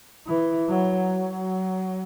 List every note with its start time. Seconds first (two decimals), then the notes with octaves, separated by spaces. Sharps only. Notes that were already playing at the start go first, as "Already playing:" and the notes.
0.27 E3
0.69 F#3
1.11 F#3